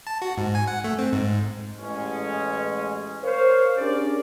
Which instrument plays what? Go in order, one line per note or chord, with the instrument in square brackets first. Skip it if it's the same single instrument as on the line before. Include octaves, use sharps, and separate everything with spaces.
[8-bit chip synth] A5
F#4
G#2
G#5
F#5
A3
C4
G#2
[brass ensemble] A1 G#3 C#4
A#4 C5 C#5 F5
C#4 D4 G4 G#4 A#4 D5